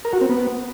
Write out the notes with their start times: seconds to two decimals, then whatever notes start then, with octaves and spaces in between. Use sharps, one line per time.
0.05 A#4
0.13 F#4
0.21 C4
0.29 B3